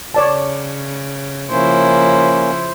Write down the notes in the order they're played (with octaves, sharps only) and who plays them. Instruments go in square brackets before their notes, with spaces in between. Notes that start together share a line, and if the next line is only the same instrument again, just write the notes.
[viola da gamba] C#3 [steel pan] C#5 D5 A5
[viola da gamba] C#3 F3 E4 [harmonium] A#3 C#4 [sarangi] C5